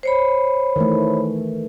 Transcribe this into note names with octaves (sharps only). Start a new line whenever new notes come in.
C5 C#5 B5
D#3 E3 A3